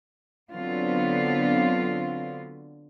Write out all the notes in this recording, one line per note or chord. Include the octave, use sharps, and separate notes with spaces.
D3 F#3 B3 C4 F4